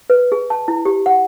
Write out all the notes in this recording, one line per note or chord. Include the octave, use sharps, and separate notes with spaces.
B4
G#4
A5
E4
G4
F#5